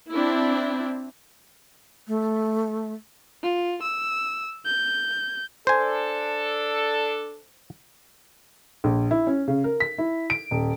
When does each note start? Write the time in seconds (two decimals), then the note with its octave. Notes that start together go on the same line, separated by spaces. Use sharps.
0.10 C4 D4 E4
2.08 A3
3.43 F4
3.82 E6
4.66 G6
5.67 D4 A4 C5 G#5
8.84 A#1
9.11 E4
9.27 C#4
9.48 C#3
9.64 A#4
9.80 B6
9.98 E4
10.30 D7
10.51 D#1